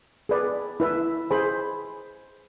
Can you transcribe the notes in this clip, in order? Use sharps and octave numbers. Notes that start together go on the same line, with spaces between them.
G#4 B4 D5
E4 B4 E5
G#4 C5 G#5 B5